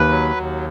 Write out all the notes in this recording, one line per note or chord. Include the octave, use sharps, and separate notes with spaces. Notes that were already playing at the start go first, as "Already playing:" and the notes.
Already playing: D#2 B4
F#3
D#2